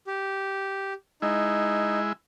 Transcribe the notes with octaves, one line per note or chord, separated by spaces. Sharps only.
G4
G#3 D#4 E4